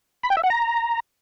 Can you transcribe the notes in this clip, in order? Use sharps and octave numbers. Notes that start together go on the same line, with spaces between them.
B5
G5
E5
F#5
A#5